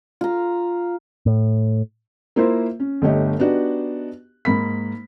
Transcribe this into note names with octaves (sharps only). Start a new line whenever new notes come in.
F4 A#5
A2
A#3 E4 F4 A#4 C5 E5
C#4
G1 D3 A3 G4 C#5 D#5
B3 D4 D#4 F#4 G4
G#2 A#3 B5 B6